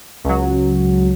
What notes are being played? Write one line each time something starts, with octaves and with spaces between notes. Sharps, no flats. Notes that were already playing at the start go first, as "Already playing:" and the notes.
C#2 F#3